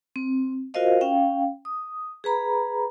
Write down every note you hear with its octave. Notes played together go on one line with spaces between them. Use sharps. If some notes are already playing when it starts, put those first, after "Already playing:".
C4
F4 F#4 A#4 C5 D#5 F5
C#4 F5 G5
D#6
G#4 B4 A#5 B5